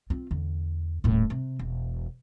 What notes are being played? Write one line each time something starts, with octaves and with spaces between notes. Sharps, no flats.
C4 F4
E2 D3
D#1 A2
C3
E1